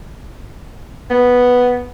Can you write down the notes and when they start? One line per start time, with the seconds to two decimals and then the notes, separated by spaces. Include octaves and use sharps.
1.10 B3